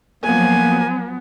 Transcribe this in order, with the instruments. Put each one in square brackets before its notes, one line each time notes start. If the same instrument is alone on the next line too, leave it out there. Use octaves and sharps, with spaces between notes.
[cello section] F3 F#3 [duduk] A#3 [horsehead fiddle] B3 [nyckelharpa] G#5